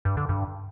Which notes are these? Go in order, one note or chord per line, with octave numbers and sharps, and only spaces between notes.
G2
D3
G2